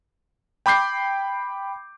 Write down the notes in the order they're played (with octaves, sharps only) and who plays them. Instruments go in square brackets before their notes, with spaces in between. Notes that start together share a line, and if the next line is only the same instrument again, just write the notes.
[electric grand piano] G5 B5 D6 G6 C7